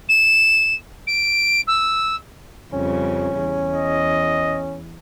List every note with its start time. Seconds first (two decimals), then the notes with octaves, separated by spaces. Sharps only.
0.09 E7
1.07 D7
1.67 E6
2.73 F2 C#3 G3 C#4
3.39 E2
3.74 D#5